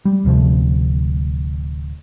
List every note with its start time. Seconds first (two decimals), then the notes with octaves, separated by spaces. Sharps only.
0.05 G3
0.25 D1 D2 C3 F3